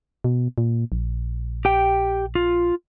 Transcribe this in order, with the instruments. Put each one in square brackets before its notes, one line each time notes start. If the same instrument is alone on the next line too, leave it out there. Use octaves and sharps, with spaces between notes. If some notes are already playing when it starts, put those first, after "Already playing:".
[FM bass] B2
A#2
A#1
[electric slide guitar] G4 G5
F4